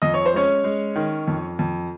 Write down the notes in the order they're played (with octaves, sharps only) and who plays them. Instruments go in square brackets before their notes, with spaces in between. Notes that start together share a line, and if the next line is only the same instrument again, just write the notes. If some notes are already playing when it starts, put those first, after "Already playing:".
[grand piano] F2 D#5
C#5
C5
G#3 C#4 C#5
G#3
D#3
F2
F2